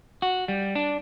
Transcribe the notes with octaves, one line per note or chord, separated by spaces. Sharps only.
F#4
G3
D4